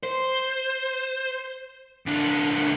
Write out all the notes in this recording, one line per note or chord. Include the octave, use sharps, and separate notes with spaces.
C5
C#2 D4